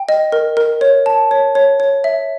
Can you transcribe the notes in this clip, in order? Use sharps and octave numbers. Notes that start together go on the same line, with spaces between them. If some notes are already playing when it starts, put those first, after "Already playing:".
Already playing: G5
D#5
A#4
A#4
C#5
A5
C#5
C#5
C#5
E5